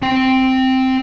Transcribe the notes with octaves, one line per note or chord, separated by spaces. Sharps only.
C4 G5